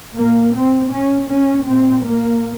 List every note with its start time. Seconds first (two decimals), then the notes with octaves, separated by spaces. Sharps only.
0.16 A#2 A#3
0.54 C4
0.91 C#4
1.29 C#4
1.66 A#2 C4
2.04 A#3